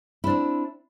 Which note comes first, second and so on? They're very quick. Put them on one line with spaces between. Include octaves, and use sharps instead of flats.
E4 D4 C4